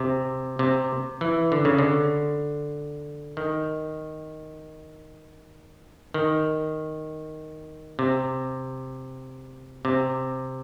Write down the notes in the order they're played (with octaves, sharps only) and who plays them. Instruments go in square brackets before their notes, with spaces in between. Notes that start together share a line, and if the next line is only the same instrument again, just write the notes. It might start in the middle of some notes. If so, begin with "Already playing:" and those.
Already playing: [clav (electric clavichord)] C3
C3
E3
D3
C#3
D3
D#3
D#3
C3
C3